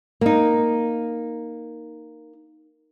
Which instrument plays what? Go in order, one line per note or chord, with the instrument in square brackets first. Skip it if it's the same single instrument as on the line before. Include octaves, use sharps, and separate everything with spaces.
[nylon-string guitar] A#3 D#4